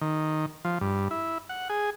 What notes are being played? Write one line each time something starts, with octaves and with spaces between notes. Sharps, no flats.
D#3
F3
G2
E4
F#5
G#4